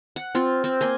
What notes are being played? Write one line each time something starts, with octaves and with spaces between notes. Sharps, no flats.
F#5
C4 F4
C4
A#3 G#5 C6